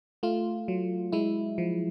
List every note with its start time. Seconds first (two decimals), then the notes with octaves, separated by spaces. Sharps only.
0.23 A3 F4
0.68 F#3
1.12 G#3 E4
1.58 F3